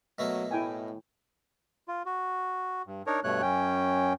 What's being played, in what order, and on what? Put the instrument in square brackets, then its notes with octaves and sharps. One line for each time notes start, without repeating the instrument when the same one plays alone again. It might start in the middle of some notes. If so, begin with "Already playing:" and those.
[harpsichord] B2 A3 A#3 [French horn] F#3
[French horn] A2 [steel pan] E4 G5 G#5
[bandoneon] F4
F#4
G2
D4 D#4 A#4 C#5
G2 B2 A3 C#5 F#6
F#2 C#4 G5